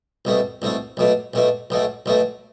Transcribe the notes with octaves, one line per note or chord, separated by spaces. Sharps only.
C2 B2 A3
C2 B2 A3
B1 B2 A3
B1 B2 A3
B1 B2 A3
B1 B2 A3